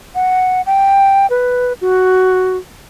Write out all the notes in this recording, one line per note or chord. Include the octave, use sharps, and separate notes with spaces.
F#5
G5
B4
F#4